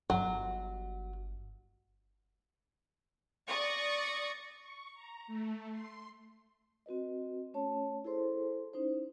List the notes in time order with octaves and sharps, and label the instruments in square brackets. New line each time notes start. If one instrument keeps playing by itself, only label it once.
[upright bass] G1 [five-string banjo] F#3
[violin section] D5 C#6 D#6 A#6
[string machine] C#6
A#5
A3
C6
[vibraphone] C4 F#4 B4 D#5
A3 C#4 C#5 A5
E4 G#4 A4 C5 C6
C#4 D#4 E4 C5